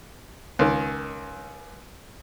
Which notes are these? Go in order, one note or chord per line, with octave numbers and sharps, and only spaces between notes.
C#2 D#3